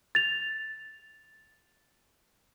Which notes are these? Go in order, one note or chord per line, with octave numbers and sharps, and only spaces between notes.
A6 F7